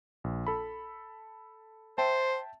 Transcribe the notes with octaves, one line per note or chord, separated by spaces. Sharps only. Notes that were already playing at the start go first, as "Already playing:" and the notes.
A#1
A4 B5
C5 E5 G5 A5